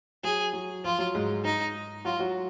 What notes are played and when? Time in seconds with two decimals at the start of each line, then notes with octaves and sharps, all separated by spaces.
0.23 F#3 G#4
0.53 F#3
0.84 F3 F4
0.99 F#3
1.15 G#2 G#3
1.45 D#4
2.05 F#3 F4 F#4
2.20 F#3 F#4